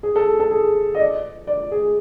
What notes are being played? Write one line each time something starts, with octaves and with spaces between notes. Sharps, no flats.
G#4
A4
A4
G#4
D#5
D5
D5
G#4